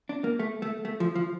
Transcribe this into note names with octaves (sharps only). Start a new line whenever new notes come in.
D4
A#3
A3
A3
A3
F3
F3